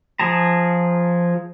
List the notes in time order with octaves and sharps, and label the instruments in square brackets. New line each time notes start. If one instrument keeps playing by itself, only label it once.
[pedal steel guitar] F3 G#4 A5 A#5